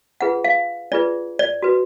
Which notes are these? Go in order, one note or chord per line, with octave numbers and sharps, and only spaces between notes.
D4 F4 G#4 B4 F#5
F5
D4 F4 G#4 B4 D5
D5
F#4 B4